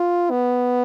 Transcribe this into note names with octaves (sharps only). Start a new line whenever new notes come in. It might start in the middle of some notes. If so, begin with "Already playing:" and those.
Already playing: F4
B3